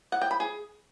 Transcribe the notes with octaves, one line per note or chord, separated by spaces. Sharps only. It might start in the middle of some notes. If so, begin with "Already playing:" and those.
F#5
G5
B5
G#4